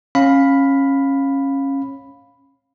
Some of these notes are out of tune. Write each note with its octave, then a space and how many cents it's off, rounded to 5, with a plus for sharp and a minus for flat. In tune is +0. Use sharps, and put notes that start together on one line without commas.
C#4 -20 F5 +10 B5 +0